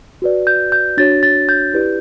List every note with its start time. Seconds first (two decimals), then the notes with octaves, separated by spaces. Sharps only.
0.22 F#4 B4 D5
0.47 G6
0.72 G6
0.97 D4 F#4 C#5 A6
1.23 A6
1.49 G6
1.74 E4 G4 B4 D5